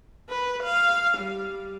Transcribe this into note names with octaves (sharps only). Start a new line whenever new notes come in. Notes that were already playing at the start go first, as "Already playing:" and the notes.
B4
F5
G3